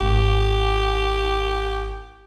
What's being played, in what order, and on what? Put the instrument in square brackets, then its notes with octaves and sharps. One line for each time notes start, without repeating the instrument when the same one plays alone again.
[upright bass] G#1 [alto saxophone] G4